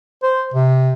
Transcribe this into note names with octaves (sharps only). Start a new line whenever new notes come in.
C5
C3